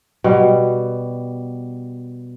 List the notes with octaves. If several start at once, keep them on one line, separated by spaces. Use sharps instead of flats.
B2 G3